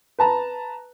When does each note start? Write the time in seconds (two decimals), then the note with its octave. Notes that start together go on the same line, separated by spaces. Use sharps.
0.19 B4 A5 A#5